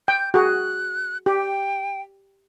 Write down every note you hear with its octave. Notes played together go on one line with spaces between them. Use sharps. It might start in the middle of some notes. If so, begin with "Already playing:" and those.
G5 G6
F#4 G#4 F#6
G4 G5